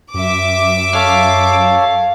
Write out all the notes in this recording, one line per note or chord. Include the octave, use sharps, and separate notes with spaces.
F#2 E5 D6
A4 C#5 F5